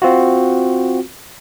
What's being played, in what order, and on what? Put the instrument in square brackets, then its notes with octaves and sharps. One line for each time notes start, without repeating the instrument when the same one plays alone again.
[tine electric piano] C4 F4 F#4